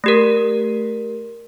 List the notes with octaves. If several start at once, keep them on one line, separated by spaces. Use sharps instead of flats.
A3 G4 A#4